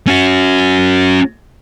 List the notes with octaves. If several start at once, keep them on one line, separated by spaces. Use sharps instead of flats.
C#4 F#4